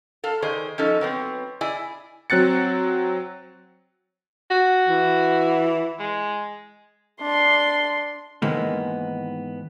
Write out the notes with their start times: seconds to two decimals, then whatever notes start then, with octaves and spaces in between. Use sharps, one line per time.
0.24 A4 F5
0.42 D#3 G#4 C5 D5
0.78 F3 C#4 D#4 A4
1.01 F#3 B3 C4
1.61 E4 G#4 D5 G#5
2.30 F#3 C4 F#6 A6 C#7
4.51 F#4
4.88 E3
6.00 G#3
7.21 D4 C6
8.42 G#2 D#3 E3 G#3 A#3 B3